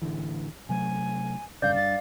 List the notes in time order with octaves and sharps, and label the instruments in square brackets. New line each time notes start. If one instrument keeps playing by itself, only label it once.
[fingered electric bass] A1 D3 E3
[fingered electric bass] C3 F#3 A3 [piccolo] G#5
[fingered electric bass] F1 G2 C#3 [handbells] D5 F5 [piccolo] G6
[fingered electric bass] G2 [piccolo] A6